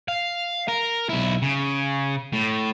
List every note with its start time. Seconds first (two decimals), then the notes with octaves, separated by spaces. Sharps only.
0.08 F5
0.68 A#4
1.09 B1 E4
1.42 C#3
2.33 A2